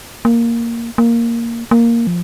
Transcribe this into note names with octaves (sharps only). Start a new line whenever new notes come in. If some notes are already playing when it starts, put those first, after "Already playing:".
A#3
A#3
A#3
F3